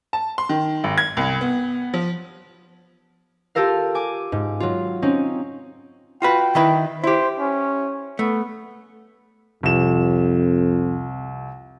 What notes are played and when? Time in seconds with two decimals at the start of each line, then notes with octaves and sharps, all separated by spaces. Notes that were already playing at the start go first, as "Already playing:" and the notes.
0.13 A5
0.38 C6
0.49 D#3
0.84 G#1
0.98 G#6
1.17 C2
1.41 B3
1.94 F3
3.55 F4 G4 A4 A#4 F5
3.95 G#5 D6
4.32 G#2
4.60 F#3 F4
5.02 C4 C#4 D#4
6.22 F4 F#4 B4 G5
6.55 D#3 E4 B4
7.04 E4 G4 C5
7.39 C#4
8.19 A3 B3
9.63 C2 F2 E7